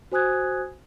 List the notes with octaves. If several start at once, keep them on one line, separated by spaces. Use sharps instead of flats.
F#4 C5 G#5 D#6 F#6 G#6